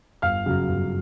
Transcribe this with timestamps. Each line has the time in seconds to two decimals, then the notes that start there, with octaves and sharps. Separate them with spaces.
0.22 G1 F5 F6
0.46 F#2 C#3 F#3
0.69 G1